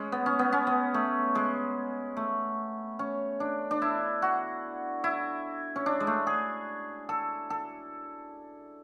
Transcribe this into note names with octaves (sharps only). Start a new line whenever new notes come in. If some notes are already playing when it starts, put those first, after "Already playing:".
Already playing: G#3 C#4
B3
C#4
B3
C#4
B3
A3
G#3
A3
C#4
D4
D4
E4
F#4
E4
C#4
D4
G#3
A3
G#4
A4
A4